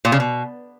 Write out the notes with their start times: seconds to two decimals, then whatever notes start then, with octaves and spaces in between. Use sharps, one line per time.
0.05 A#2
0.12 C#3
0.20 B2